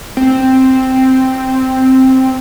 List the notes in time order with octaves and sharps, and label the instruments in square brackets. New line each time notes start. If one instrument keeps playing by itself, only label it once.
[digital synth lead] C4